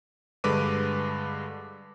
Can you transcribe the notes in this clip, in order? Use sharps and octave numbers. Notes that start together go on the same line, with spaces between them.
G2 D3 G#3 B4 D6 D#7